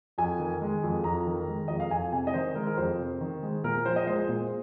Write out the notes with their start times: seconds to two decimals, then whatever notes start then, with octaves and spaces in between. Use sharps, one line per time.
0.18 F2 G#5
0.39 D#3
0.62 G#3
0.83 F2
1.04 F2 A#5
1.26 D#3
1.48 G#3
1.68 F2 D#5
1.80 F5
1.91 F2 G#5
2.12 C3 G#5
2.27 D#5
2.34 D#3 C5
2.55 G#3 A#4
2.66 A#4
2.77 F2 C5
2.99 C3
3.21 D#3
3.43 G#3
3.64 A#2 A#4
3.85 F3 C5
3.96 D#5
4.07 G#3 C5
4.29 A#2